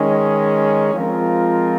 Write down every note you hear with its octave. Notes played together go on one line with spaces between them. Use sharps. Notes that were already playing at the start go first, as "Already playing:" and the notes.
Already playing: D#3 G#3 C#4
F3 G#3 C4 F4 A#4